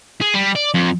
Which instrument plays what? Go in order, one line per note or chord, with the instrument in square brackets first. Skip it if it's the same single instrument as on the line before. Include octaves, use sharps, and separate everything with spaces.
[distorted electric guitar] G#4
G3
D5
F2